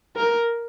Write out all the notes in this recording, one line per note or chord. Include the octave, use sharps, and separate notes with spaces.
A#4